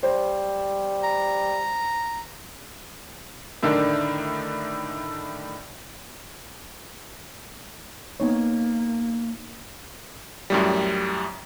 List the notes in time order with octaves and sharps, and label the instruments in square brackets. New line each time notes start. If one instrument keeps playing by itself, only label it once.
[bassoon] G3 [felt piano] C5
[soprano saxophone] A#5
[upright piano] A2 D3 D#3 D4
[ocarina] A#3 [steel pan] B3 D#4 C#5
[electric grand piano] F#2 A2 G3